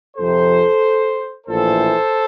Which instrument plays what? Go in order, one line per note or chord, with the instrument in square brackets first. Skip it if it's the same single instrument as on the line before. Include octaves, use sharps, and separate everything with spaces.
[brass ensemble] F2 C3 F3 A4 C5
A#1 A2 E3 A4 C5